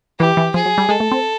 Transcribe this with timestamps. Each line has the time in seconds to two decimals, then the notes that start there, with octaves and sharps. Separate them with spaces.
0.19 E3 G4
0.37 E3
0.54 F3 G#4
0.66 F#3
0.78 G3
0.89 G#3 A4
1.00 A3
1.12 C4